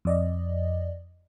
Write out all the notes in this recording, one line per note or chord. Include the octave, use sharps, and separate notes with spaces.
F2 D5 D#5